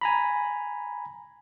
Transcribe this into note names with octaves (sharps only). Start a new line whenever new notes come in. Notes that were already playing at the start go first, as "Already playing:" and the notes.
G#5 A#5 B5